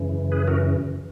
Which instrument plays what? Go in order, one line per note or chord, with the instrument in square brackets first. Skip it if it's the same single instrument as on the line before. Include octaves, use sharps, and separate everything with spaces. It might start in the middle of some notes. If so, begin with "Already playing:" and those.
Already playing: [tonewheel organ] F#2 C#3 E3
G#4 B4
F#4 A#4